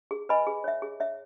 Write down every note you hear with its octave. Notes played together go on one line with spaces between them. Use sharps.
G#4
B4 D#5 G#5 B5
G#4
C#5 E5
G#4
C#5 E5